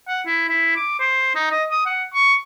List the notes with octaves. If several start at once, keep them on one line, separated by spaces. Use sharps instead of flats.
F#5
E4
E4
D6
C5
D#4
D#5
D#6
F#5
C#6